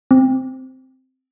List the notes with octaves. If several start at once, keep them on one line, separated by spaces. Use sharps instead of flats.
C4